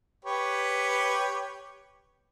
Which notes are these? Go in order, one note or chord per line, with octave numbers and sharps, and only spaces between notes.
G4 B4 C#5